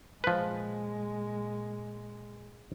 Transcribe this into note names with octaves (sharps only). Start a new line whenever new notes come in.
A#2 F3 G#3 B4